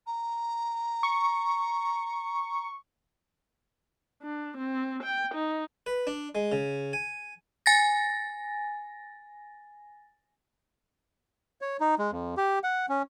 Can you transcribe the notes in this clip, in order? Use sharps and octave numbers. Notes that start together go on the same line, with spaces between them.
A#5
C#6
D4
C4
G5
D#4
B4
D4
G#3
C#3
G#5
G#5 A6 A#6
C#5
D#4
G#3
F2
G4
F#5
C#4